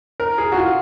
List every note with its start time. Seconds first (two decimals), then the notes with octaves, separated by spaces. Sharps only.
0.20 A#4
0.38 G#4
0.52 F#4
0.57 F4